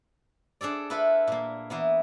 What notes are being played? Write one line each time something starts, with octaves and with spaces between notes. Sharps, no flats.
D4 G#4 A4 D5
E4 F4 A4 B4
A#2 A#3
E3 A#3 B3